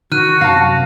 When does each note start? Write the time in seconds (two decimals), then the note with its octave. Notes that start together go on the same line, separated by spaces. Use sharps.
0.12 D#3 F#4 F6 F#6 D#7
0.41 F#2 C3 F5 A5